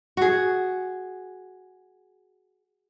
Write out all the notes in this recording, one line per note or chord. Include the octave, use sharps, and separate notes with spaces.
F#4 G#4